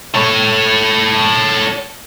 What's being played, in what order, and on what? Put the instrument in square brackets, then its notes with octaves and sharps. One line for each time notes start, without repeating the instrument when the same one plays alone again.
[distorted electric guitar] A4 C#5